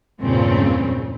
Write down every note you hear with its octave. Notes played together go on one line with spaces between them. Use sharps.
E2 G2 A#2 C#3 C4 C#4